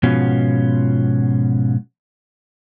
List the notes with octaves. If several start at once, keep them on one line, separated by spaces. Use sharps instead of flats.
G#2 B2 F3 B3 C#4 F4